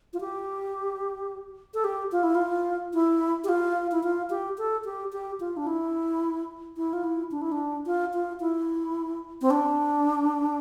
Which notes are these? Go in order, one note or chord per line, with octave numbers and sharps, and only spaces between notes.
F4
G4
A4
G4
F4
E4
F4
E4
G4
F4
E4
F4
G4
A4
G4
G4
F4
D4
E4
E4
F4
E4
D4
E4
D4
F4
F4
E4
C4
D4